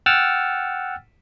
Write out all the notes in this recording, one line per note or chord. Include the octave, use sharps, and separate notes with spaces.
F#5 G5 E6 F6 A6